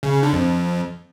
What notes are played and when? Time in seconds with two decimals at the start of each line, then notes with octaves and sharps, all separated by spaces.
0.03 C#3
0.13 C#3
0.23 D3
0.33 F2